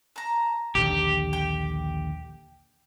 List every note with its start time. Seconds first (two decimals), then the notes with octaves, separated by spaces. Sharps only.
0.16 A5 A#5
0.75 A#1 D#2 D3 G4
1.33 G5